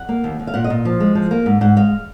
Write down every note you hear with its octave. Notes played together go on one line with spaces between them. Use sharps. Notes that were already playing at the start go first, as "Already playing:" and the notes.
Already playing: F#5
A#3
D#2
D#2
F5
A#2 F#5
D#5
A#2
F3
G#3
F3
A#3
G#2
G#2 F#5
G#3 F5